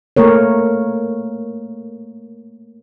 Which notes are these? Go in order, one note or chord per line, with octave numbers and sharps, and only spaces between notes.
A3 A#3 A#4 C#5